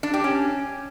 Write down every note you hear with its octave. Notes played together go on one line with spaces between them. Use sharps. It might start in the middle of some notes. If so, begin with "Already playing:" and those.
D4
G4
C#4